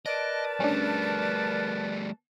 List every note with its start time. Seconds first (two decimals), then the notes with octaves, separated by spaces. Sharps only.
0.06 A#4 B4 D5 D#5 A5 D7
0.60 G3 A3 C#4 D4